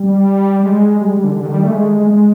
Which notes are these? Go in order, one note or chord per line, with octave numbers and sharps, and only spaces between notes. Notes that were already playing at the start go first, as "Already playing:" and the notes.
Already playing: G3
G3
G#3
G3
G3
D3
D3
D#3
G3
A3
G#3
G#3